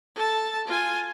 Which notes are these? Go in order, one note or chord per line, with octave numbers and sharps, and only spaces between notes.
A4 A5
F4 G#5